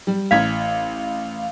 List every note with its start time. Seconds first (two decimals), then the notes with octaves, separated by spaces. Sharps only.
0.07 G3
0.31 A1 F5 G#6 B6